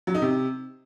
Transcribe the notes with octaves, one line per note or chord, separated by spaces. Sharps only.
F#3
D#4
C3